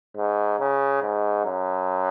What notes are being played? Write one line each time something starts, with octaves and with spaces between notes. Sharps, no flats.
G#2
C#3
G#2
F#2